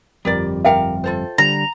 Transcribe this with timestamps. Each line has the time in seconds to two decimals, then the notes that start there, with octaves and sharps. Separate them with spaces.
0.25 G1 F2 G3 G4 A#4 D5
0.65 G4 A#4 E5 F5 G5
1.04 F4 A4 C5
1.38 D3 G3 A#5